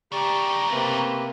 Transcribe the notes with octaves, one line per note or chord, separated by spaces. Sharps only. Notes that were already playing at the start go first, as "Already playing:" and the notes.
C#3 A3 G4 D5 A#5
C3 A#3 B4